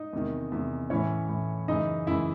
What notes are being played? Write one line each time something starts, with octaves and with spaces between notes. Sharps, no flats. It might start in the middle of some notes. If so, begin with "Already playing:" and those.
Already playing: D#4 D#5
E2 C3 D#3
E2 C3 D#3
A2 E3 C#4 C#5
A2 E3
F#2 C#3 E3 D#4 D#5
F#2 C#3 E3 E4 E5